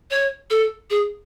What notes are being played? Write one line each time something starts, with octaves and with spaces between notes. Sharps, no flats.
C#5
A4
G#4